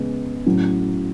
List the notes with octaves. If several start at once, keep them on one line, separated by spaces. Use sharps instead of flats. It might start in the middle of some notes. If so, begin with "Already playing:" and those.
Already playing: C#3 G#3 B3
A2 F#3 C#4